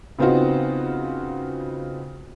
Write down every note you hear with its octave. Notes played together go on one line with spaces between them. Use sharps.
C#3 B3 C4 D#4 F4 F#4